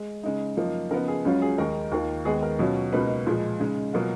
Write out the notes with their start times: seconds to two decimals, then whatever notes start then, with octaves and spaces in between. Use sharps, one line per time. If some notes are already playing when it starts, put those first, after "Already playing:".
Already playing: G#3
0.23 C#3 G#3 D#4
0.57 F#2 F3 A#3 D#4
0.91 C#3 F3 B3 D#4 A#4
1.08 G#4
1.25 C#2 C#3 F#3 C#4 F4
1.42 G#4
1.58 D#2 D#3 G#3 D#4 A#4
1.92 D#2 D#3 A#3 F4
2.25 D#2 D#3 G#3 B3 G#4
2.43 A#4
2.59 B2 F#3 C#4 F4
2.93 C#2 B2 A#3 D#4 B4
3.27 A#2 F3 G#3
3.60 C#3 G#3 D#4
3.93 B2 F#3 A#3 F4